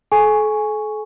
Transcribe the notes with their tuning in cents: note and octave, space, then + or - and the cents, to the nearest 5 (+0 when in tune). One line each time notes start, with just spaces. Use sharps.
A4 -40 G#5 +0 C#6 +0